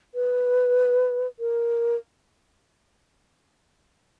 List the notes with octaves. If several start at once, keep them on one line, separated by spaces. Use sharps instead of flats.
B4
A#4